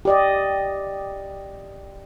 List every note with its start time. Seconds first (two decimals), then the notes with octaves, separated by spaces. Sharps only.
0.05 G4 D5 D#5